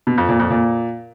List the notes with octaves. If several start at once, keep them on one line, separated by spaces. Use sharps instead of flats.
B2
F2
A#2
F2
A#2